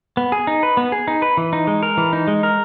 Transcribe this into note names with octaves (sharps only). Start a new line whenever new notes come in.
B3
G#4
D#4
B4
B3
G#4
D#4
B4
E3
D#4
G#3
A#4
E3
D#4
G#3
A#4